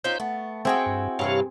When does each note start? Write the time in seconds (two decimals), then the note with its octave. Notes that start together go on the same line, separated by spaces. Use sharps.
0.04 C#4 D#4 F4 C5 G6
0.20 A3 B3
0.65 C4 E4 F#4 G#4 G5
0.86 G2
1.19 G2 C3 E3 C#5 F5